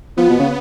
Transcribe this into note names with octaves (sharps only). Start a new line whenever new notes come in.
F3 B3
B2
C#3